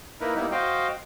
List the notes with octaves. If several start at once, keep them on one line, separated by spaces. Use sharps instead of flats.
A#3 D#4 E4 A#4 B4
G3 A#3 B3 D#4 E4
F#4 C5 D#5 F5 G5